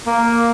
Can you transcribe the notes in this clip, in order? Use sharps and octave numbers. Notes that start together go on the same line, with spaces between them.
A#3